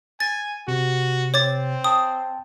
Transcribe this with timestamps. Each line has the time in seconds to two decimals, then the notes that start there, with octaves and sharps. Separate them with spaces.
0.20 G#5 A6
0.68 C3 F#4
1.34 C4 C#5 D6 A6
1.84 G5 A5 D#6